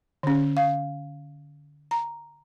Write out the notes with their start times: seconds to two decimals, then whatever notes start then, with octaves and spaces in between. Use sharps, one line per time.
0.23 D3 C#4
0.57 F5
1.91 A#5